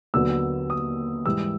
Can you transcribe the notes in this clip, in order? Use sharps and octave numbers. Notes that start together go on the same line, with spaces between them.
D#2 D3 F#3 B3 E6
D#6
G#2 E3 G3 E6